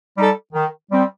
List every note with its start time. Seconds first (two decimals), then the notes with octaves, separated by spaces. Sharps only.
0.16 G3 D#4 A4
0.53 D#3
0.90 G3 C4